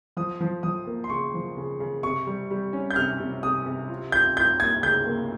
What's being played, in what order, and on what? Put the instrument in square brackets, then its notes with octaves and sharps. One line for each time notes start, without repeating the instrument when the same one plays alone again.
[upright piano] F3 [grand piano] D#6
[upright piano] F3
[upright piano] F3 [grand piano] D#6
[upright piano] A#3
[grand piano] C6
[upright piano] C#3 [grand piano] C#6
[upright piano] F3
C#3
C#3
[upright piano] C3 [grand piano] C#6
[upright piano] G3
G3
C#4
[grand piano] G6
[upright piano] C3 [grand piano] F6
[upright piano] C3
[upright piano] C3 [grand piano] D#6
[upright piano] C3
F4
[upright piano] F4 [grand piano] G6
[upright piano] F4 [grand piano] G6
[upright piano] A#3 [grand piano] G#6
[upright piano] C#3 [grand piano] G6
[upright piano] A#3